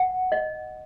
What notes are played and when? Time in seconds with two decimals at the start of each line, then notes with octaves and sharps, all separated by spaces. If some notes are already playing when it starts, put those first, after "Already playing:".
Already playing: F#5
0.32 D#5